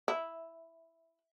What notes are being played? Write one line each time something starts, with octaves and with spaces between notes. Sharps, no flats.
E4